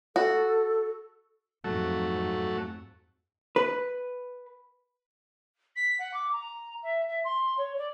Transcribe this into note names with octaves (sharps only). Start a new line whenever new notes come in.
F#4 A4
F2 G#2 F#3 A3
B4
B6
F#5
D6
A#5
E5
E5
C6
C#5
D5